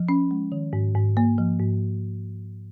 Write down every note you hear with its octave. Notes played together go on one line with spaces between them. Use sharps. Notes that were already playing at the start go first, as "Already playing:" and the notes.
Already playing: F3
C#4
G#3
D#3
G#2
G#2
A#3
F3
G#2